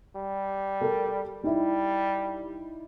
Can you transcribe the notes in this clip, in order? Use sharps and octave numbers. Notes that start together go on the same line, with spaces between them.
G3
A4 A#4 D5
G3 D#4 E4